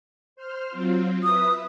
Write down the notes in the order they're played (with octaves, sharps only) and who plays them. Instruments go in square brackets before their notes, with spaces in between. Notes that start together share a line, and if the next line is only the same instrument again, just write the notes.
[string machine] C5 F6
F#3 C4 F4
[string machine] B4 E5 [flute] D#6